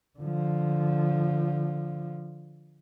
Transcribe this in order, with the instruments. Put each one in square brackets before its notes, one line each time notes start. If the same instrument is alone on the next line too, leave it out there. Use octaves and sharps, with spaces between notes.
[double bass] D3 F3